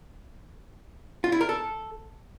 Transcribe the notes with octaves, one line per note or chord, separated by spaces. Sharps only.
F4
E4
A#4
A4